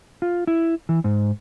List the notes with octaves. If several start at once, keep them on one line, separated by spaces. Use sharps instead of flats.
F4
E4
E3
G#2